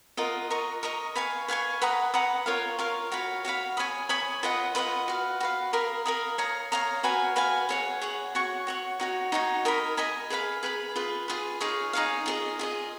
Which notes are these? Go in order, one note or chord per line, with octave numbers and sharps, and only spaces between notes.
F4 A#4 D#5 F#5
A#4 D#5 A#5 C#6
A#4 D#5 A#5 C#6
B4 F5 G#5 C#6
B4 F5 G#5 C#6
B4 F#5 A#5 D#6
B4 F#5 A#5 D#6
F4 A#4 C#5 F5
F4 A#4 C#5 F5
F#4 C#5 F5 B5
F#4 C#5 F5 B5
C#5 G#5 B5 D#6
C#5 G#5 B5 D#6
F4 B4 D#5 F#5
F4 B4 D#5 F#5
F#4 B4 F5
F#4 B4 F5
A#4 F5 B5 D#6
A#4 F5 B5 D#6
C#5 F5 A#5 D#6
C#5 F5 A#5 D#6
F#4 B4 F5 G#5
F#4 B4 F5 G#5
G#4 C#5 F#5
G#4 C#5 F#5
F#4 C#5 F#5 C#6
F#4 C#5 F#5 C#6
D#4 F#4 C#5
D#4 F#4 C#5
A#4 D#5 G#5 B5
A#4 D#5 G#5 B5
G#4 B4 F5 B5
G#4 B4 F5 B5
F4 G#4 B4
F4 G#4 B4
D#4 G#4 C#5 F5
D#4 G#4 C#5 F5
F4 G#4 D#5
F4 G#4 D#5